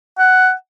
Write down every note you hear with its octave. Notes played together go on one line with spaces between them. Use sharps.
F#5